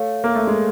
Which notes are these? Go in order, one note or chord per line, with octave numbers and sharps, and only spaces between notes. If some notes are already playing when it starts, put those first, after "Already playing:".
Already playing: A3 C#5 F5
A#3
A3
G#3